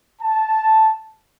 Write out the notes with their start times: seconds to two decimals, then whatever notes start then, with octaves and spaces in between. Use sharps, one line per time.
0.22 A5